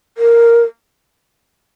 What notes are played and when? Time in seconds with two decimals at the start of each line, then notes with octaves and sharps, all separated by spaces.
0.18 A#4